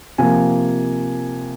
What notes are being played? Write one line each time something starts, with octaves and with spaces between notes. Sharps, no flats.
C3 F3 A#3 G#5